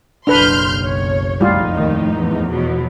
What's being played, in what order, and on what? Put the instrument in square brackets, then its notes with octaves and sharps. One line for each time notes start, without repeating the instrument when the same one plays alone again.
[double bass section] F#1 B1 [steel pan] D4 B4 [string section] C6 F6 G6
[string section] C#5
[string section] F2 A2 D#4 [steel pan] G3 F4
[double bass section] D#2 D#3
E2
[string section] B2 F3 F#3